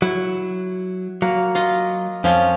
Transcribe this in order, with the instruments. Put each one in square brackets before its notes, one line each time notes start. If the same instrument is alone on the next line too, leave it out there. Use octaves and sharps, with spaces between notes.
[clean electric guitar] F#3 [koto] E4
[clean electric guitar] F#3 [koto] A#3
[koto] F4 D#5
[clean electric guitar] F2 [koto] F3 C#4 F4